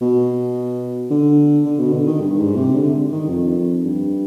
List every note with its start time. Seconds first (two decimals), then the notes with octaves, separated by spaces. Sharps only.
0.01 B2
1.11 D3
1.65 D3
1.79 B2
1.93 D3
2.07 D#3
2.21 G2
2.38 G#2
2.57 C3
2.75 D3
3.12 D#3
3.29 F2
3.85 G2